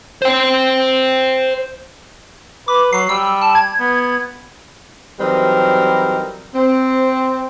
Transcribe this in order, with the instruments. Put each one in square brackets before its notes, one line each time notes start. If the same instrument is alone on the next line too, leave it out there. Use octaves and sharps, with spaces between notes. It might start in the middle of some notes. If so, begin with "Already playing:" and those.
[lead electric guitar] C5 G5
[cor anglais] B4 [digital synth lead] D6
[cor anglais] F#3 [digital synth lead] C7
[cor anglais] G3 [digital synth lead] E6
[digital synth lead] A5
G#6
[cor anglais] B3
[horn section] E3 F#3 G3 C4 D#4 A#4
C4